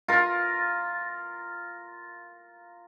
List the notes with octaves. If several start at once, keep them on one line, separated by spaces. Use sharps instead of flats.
F4 A#4